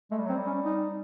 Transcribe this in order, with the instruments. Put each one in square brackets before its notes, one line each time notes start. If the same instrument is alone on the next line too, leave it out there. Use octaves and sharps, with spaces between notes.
[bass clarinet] G#3 [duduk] A3
[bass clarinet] G3
F#3
[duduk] C4
[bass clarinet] G3
[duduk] C#4
D#4